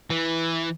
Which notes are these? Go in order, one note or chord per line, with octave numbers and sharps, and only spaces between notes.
E3